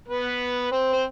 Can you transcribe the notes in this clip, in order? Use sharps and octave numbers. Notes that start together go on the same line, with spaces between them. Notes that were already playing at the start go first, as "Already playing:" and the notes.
B3 B4
C4 C5
C5